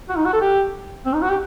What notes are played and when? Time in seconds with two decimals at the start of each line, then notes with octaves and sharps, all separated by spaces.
0.09 F#4
0.17 D#4
0.25 F#4
0.33 A4
0.41 G4
1.06 C4
1.14 D#4
1.22 F#4
1.30 G4